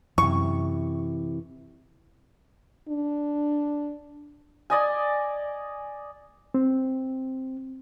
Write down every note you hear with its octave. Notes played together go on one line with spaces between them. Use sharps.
F#2 C3 E3 C#6
D4
D5 D#5 G#5
C4